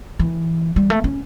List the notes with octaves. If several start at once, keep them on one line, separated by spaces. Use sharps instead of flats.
E3
G3
A3
C#4